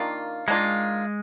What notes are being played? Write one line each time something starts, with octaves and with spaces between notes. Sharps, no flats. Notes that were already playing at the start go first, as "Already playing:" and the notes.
Already playing: D#3 A#3 D4 F4
D#3 G#3 A#3 D4 F4